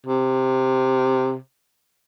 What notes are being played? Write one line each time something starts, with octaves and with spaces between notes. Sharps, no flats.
C3